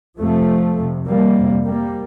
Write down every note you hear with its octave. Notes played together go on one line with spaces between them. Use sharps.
F2 C3 F3 A3
F2 C3
G3 A#3
F2 C3
G3 A#3